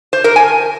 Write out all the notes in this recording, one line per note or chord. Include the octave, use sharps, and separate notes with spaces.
C5
A#4
G#5